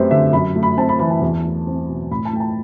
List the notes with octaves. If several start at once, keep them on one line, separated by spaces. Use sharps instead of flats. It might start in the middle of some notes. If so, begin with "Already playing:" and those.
Already playing: F#2 A3 C4 G4 B4 C5
D3 E5
F#2 B5
A3
B5
C4 A5
B5
E3 B5
A5
E2
A3
C4
B2
A2 B5
A5
A3 G5
A5